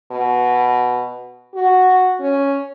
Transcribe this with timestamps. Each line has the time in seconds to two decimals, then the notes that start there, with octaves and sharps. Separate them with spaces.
0.11 B2
1.54 F#4
2.20 C#4